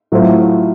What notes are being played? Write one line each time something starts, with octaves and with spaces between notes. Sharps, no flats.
A2 F#3 A3 C4 F4